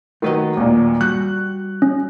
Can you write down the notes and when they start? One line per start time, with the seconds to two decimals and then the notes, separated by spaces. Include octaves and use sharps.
0.22 D#3 F#3 A3 B4 D#5
0.57 D#2 A#2
1.01 G3 F#4 F#6
1.82 C#4